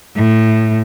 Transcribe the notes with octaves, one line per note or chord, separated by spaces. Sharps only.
A2